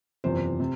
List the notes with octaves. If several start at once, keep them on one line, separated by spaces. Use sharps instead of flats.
F#1 E2 C3 F3 C5
C3